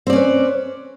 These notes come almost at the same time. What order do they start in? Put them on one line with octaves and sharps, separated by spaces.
C4 D5 C#4 B4